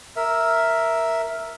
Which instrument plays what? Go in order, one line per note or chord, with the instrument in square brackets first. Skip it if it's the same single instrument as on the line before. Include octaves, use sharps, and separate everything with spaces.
[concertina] A#4 E5